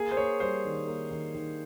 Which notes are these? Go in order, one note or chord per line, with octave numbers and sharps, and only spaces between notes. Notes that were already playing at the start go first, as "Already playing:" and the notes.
Already playing: A#3 G#4
C5
A#3 C#5
G3 C5
D#3
A#3
D#3
D#3